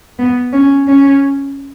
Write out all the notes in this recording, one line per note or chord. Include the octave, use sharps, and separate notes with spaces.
B3
C#4
C#4